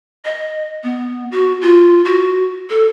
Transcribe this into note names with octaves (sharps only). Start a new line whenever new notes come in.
D#5
B3
F#4
F4
F#4
A4